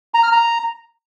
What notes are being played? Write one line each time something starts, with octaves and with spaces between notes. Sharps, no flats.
A#5
F6
A#5